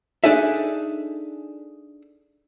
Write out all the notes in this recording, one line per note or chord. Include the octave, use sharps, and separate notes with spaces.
D4 D#4 G#4 A4 E5